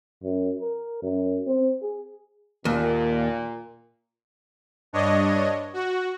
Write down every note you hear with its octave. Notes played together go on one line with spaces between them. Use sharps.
F#2
A#4
F#2
C4
G#4
D#2 A#2
G2 D4 C#5 D#5
F#4